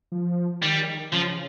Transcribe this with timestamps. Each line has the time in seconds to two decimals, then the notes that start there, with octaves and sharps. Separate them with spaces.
0.12 F3
0.63 D#3 G3
1.13 C#3 F3